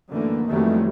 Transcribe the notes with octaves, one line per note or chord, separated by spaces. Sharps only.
F#2 D3 E3 A3 A#3
F2 D#3 E3 F#3 G3 A3